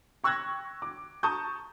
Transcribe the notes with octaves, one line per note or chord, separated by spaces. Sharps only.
G5 C#6 E6 F#6 G#6 A#6
D6
A5 A#5 C#6 D#6 G6